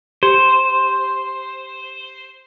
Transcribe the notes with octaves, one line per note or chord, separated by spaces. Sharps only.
G4 C5